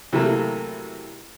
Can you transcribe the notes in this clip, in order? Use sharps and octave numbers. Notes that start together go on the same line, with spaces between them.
C3 E3 F#3 A3 A#3